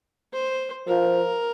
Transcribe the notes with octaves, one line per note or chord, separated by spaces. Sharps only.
C5
F3 A#4